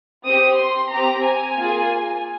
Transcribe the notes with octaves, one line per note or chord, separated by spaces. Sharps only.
C4 G4 D#6
C6
C4 G4 A#5
G#5
A#3 F4 G#4